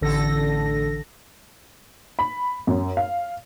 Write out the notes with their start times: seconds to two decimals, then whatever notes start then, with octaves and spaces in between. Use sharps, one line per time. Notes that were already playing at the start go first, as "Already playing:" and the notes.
0.01 A1 D3 A4 A#6
2.19 B5
2.67 F#2
2.97 F5